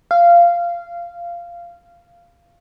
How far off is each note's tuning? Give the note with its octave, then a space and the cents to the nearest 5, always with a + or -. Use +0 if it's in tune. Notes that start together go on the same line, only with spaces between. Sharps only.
F5 -15